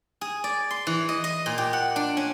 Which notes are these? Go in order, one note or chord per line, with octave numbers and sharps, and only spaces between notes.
G#4
D5
C6
E3
D#5
D#5
A#2
G4
F#5
D4
C#4